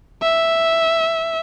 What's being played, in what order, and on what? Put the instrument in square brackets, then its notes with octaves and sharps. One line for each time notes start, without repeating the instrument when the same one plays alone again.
[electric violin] E5